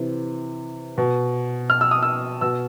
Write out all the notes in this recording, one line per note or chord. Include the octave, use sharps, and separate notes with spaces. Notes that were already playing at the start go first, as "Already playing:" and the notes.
Already playing: C3 E3
B2
F6
E6
D#6
E6
B2 E6